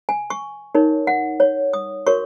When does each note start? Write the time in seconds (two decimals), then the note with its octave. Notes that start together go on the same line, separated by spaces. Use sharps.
0.09 G#5
0.30 C#6
0.75 D#4 A#4 C#5
1.07 F#5
1.40 C#5
1.73 D#6
2.06 F#4 A#4 C#5 C#6